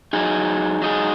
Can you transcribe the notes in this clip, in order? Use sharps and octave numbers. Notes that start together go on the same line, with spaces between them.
F#3 D#4 G#4
F#3 D#4 G#4